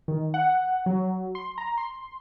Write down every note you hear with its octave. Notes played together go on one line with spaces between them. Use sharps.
D#3
F#5
F#3
C6
A#5
C6